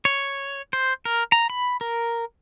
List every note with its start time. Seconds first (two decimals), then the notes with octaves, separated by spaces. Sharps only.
0.05 C#5
0.73 C5
1.05 A#4
1.32 A#5
1.50 B5
1.81 A#4